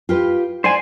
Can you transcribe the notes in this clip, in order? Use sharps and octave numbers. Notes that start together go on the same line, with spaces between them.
F4 G4 B4
C5 D5 F#5 G#5